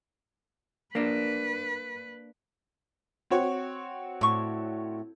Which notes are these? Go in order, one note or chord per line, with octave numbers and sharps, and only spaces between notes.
A#3 D4 B4
C4 F#4 C#5
A2 D3 C#6